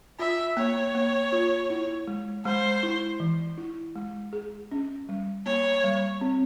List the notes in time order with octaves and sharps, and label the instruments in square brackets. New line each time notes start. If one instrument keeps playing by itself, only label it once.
[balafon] F4 [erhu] E5
[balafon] A#3 [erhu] C#5
[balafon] A#3
F4
E4
G#3
[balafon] G#3 [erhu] C5
[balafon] E4
E3
E4
G#3
G#4
C#4
G3
[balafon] A#3 [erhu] C#5
[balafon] G3
C4